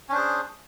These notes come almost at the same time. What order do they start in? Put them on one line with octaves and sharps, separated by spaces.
C#4 D4 C5 G#4